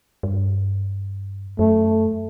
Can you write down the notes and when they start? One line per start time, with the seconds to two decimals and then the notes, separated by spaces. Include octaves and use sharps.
0.23 G2
1.59 F#2 A3